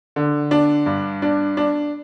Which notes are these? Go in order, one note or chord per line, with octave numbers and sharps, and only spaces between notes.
D3
D4
G2
D4
D4